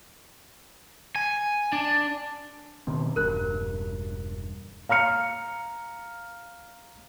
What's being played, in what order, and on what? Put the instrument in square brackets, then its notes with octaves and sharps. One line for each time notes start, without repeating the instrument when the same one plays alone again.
[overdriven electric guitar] G#5
D4
[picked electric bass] B2 D#3 C4
[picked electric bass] E1 G2 [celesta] A#4 F#6
[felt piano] F5 A#5 F6 C#7